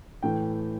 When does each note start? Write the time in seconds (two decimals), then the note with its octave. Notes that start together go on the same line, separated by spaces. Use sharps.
0.23 A2 E3 G5